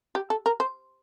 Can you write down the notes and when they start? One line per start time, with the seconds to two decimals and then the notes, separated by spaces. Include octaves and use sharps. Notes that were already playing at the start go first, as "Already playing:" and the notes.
0.15 G4
0.30 A4
0.46 A#4
0.60 C5